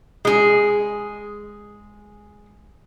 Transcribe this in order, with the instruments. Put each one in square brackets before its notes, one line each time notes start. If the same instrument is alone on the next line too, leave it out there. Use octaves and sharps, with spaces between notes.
[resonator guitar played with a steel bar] G#3 G#4